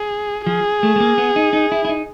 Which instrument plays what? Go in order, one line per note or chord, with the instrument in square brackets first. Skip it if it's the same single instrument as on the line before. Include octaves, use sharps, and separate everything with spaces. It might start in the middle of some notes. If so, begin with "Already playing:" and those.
Already playing: [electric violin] G#4
[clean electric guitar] F3 [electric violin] G#4
[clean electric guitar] A3
A3
A#3
B3
D#4
D#4
E4
E4
D#4